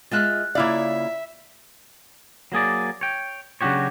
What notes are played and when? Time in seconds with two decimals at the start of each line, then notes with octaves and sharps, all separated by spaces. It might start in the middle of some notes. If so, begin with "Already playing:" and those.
0.11 G#3 F4 E5 F6 F#6 A6
0.55 C#3 A#3 E4 F4 D5 E5 F5
2.52 F#3 A#3 G#4 D5
3.01 C#5 G5
3.61 C#3 F#3 D4 F#4 G4 C#5